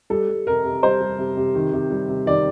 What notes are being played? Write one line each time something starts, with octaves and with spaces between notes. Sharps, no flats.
G3 A4
G3
C3 A#4
C3
G3 C5
G3
C3
C3
D#3
C3
G3
C3
D#3 D5